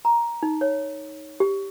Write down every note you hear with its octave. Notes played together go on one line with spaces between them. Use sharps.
A#5
D#4
C#5
G4